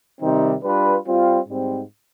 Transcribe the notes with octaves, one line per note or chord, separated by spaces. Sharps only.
C3 D#3 G3 C4 D#4
G3 D4 F4 B4
G3 C4 F4
G#2 G3 C4